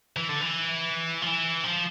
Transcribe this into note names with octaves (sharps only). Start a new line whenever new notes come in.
E3
D3
E3
F3
E3
F3